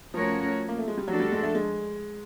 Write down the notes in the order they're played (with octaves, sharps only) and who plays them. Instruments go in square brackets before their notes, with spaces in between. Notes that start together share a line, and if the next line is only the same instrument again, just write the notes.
[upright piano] F3 [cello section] A3 C#4 F#4 A#4 C#5
[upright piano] A#3
A3
G#3
G3
[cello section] F3 A3 D4 F#4 A4 [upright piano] F#3
[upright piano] G3
G#3
A3
G#3